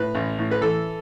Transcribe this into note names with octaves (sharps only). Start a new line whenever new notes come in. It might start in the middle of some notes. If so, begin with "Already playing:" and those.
Already playing: A2 B4
A1
A2
B4
E3 A4